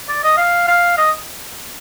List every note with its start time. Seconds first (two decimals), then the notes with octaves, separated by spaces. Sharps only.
0.08 D5
0.23 D#5
0.37 F5
0.68 F5
0.97 D#5